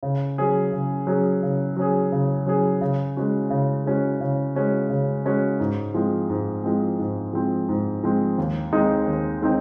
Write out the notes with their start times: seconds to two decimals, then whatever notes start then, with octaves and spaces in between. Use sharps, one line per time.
0.03 C#3
0.38 F#3 C#4 G#4
0.72 C#3
1.07 F#3 C#4 G#4
1.43 C#3
1.77 F#3 C#4 G#4
2.12 C#3
2.46 F#3 C#4 G#4
2.81 C#3
3.17 G#3 C#4 F#4
3.50 C#3
3.86 G#3 C#4 F#4
4.21 C#3
4.56 G#3 C#4 F#4
4.89 C#3
5.25 G#3 C#4 F#4
5.60 G#2
5.94 F3 G#3 C4
6.30 G#2
6.64 F3 G#3 C4
6.99 G#2
7.33 F3 G#3 C4
7.69 G#2
8.04 F3 G#3 C4
8.38 D#2
8.72 D#3 G#3 C4 D#4
9.07 D#2
9.42 D#3 G#3 C4 D#4